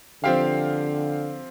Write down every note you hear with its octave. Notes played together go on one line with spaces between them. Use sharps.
D3 F3 C4 G4 F5